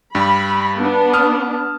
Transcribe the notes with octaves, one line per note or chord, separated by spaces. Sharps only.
G2 G3 B5
B3 D4
A5 D#6 F6